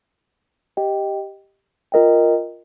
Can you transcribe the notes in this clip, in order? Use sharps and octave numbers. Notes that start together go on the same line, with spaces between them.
G4 D#5 G5
F4 A#4 D#5 G5